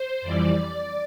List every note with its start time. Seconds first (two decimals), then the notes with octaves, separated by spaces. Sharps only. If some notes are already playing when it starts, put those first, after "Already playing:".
Already playing: C5
0.22 F2 E3 G3 D5